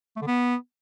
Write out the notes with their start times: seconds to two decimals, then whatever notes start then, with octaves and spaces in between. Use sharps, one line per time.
0.17 A3
0.22 D3
0.27 B3